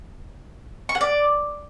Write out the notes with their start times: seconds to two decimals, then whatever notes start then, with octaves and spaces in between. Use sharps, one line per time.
0.89 C#6
0.95 F#5
1.01 D5